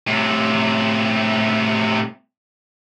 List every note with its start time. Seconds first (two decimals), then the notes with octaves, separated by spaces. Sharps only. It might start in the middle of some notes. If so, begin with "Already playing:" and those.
0.07 A2 C3